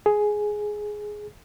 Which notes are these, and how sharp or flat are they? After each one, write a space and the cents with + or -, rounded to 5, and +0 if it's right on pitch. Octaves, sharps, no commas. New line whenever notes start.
G#4 +10